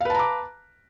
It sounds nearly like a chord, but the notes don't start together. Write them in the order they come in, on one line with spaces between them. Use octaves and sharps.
F5 B4 A5 A#5 D6